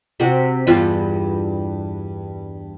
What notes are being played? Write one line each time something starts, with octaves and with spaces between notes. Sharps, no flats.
C3 F#4
E2 G2 F4